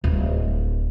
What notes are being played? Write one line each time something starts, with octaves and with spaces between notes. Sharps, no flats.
D1 G3